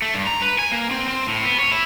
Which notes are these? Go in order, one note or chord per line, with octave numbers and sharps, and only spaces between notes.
A3
G2
A#5
B4
G#5
A#3
C4
C4
A2
B3
C#5
E4